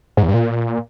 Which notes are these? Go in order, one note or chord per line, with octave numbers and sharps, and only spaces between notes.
G#2
E2
G2
A#2